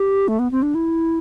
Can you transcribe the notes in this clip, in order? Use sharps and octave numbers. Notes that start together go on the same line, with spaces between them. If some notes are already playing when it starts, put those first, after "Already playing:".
Already playing: G4
A3
B3
C4
D4
E4